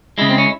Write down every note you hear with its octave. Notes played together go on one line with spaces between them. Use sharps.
C#3 G#3 E4
C4
C#4